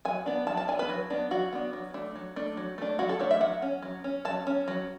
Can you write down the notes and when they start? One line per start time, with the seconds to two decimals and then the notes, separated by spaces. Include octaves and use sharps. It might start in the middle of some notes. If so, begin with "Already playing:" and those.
0.05 F#3 G#5
0.26 B3 D4
0.47 F#3 A5
0.57 A5
0.68 D4 G#5
0.72 B3
0.79 B4
0.89 F#3
1.10 B3 D4
1.31 F#3 F#4
1.53 B3 D4
1.73 F#3
1.94 A3 D4
2.16 F#3
2.36 A3 D4
2.57 F#3
2.78 A3 D4
2.99 F#3 F#4
3.09 A4
3.19 A3 D4 C#5
3.31 E5
3.41 F#3 F#5
3.62 C#4
3.82 F#3
4.04 C#4
4.25 F#3 A5
4.47 C#4
4.68 F#3